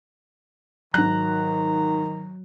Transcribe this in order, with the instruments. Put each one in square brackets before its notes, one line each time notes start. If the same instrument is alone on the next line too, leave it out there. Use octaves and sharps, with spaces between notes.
[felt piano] G#2 F#6 [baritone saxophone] D#3 [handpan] F#3 [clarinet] A#5